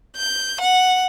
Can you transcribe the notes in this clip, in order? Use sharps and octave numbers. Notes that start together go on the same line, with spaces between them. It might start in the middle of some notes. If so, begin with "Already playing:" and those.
G6
F#5